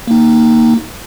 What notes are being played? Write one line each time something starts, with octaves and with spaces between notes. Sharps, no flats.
A#3 D#4